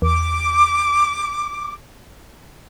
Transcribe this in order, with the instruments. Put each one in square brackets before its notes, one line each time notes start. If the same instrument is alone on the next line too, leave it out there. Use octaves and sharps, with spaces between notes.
[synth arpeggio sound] E2 [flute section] D6